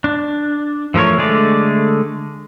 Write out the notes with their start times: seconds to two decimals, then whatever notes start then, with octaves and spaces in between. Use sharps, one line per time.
0.04 D4
0.94 E3 F3 A3 A#4 C#5
1.18 D3 G#3 A3 G#4 D5